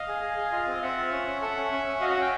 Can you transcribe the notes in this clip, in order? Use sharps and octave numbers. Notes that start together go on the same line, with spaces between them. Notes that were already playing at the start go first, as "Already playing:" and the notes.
Already playing: D#5 F5
G#4
G#4
G#4
F4 D#5 F5
C4
C4 E5 F#5
F4
C#4
C#4
A4 E5 F#5
C#4
C#4
C#4
F#4 D#5 F5
E5 F#5
C#4 F5 G5